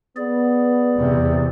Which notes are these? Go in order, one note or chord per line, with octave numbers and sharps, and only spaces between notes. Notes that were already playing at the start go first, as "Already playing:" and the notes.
B3 G#4 D5
E2 C3